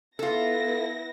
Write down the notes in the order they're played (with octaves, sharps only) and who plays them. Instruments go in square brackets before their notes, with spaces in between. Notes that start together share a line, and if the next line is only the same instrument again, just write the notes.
[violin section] B3 E4 A#6 [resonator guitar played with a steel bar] F4 A4